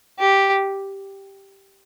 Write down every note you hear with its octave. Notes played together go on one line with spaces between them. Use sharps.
G4